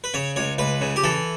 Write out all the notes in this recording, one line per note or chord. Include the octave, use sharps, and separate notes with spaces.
B4
C#3 C#5
C#2 C#5
C#2 B4
C#3
G4
E3 A4